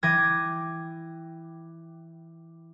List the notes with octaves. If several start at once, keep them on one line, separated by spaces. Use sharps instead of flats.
E3 G5 D6 G#6 A#6 D#7